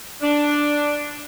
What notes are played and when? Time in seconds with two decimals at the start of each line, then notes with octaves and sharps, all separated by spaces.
0.22 D4